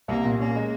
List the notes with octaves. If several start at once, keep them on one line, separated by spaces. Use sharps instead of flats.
C2 A#3
A#2
A#3 C#4
G#3